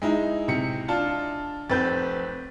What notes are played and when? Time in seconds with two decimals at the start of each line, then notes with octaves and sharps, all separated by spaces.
0.02 G#3 D#4 E4
0.48 C3 C#7
0.88 D4 F4 A5
1.70 F1 C4 B4 G6 A6